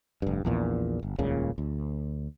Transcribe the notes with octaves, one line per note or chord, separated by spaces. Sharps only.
F1 G2
A#1 E2 A#2
G1
D#1 C#2 A#2 C#3
D2